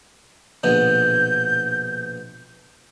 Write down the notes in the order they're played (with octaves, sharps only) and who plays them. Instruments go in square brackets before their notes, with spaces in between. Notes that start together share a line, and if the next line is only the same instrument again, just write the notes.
[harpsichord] A#1 B2 D3 [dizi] G6